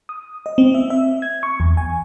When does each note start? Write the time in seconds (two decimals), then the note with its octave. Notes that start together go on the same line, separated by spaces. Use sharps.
0.09 D#6
0.46 D#5
0.58 C4
0.74 E5
0.90 E5
1.22 G#6
1.43 C#6
1.60 E2
1.77 G#5